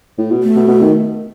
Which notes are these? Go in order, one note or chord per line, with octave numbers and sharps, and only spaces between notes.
A2
B2
A3
B2
B2
D#3